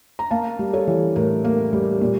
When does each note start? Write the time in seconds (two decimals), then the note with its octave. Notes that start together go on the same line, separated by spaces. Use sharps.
0.19 A#5
0.31 A#3 F5 A5
0.59 G3
0.73 A4 C#5
0.87 E3
1.16 A2 A#4
1.44 A#3
1.73 G3
2.01 A#2